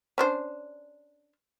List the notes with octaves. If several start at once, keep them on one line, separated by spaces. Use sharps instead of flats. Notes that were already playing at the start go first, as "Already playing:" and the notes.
C#4 D4 C5